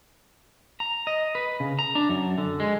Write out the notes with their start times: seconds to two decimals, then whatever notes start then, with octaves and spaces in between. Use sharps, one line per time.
0.80 A#5
1.07 D#5
1.35 B4
1.60 C#3
1.79 A#5
1.95 D4
2.09 F#2
2.38 D3
2.60 G#3